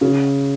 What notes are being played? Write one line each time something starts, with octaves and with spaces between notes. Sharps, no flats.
C#3